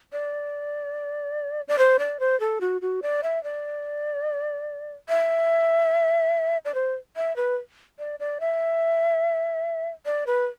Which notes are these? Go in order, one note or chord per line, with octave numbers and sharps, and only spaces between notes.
D5
D5
C5
D5
C5
A4
F#4
F#4
D5
E5
D5
E5
D5
C5
E5
B4
D5
D5
E5
D5
B4